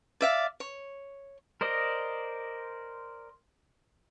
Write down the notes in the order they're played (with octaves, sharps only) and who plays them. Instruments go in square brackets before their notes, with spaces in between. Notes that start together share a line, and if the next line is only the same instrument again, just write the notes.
[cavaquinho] D5 E5 F5
C#5
[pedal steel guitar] A#4 C5 D5 D#5